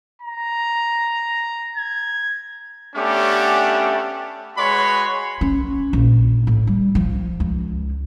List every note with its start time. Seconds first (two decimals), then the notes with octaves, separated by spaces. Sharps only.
0.22 A#5
1.77 G#6
2.96 A3 B3 C#4 D4 G4
4.57 G#3 F#4 B4 C#5 B5 C6
5.41 C#4
5.93 A#1
6.47 A2
6.67 G3
6.95 F3
7.40 C#2